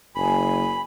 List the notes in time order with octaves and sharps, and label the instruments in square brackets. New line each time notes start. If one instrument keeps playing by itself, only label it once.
[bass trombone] F#1 [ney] G#5 [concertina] B5